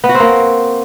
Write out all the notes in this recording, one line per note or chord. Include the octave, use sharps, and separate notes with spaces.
B3
F#4
C4
A#3